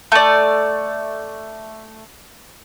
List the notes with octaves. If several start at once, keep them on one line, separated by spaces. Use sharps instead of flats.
A3 D5